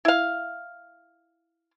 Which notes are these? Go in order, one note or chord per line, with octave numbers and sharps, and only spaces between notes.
E4 F5